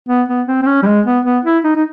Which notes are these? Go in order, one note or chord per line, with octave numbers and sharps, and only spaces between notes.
B3
B3
C4
C4
C#4
G3
G#3
B3
B3
E4
D#4
D#4